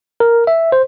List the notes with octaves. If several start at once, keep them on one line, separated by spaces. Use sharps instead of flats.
A#4
E5
C5